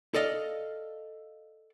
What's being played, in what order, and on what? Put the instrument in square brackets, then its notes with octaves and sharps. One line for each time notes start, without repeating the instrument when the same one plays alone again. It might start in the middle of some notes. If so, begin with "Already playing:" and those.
[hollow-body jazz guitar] A4 D5 D#5 F5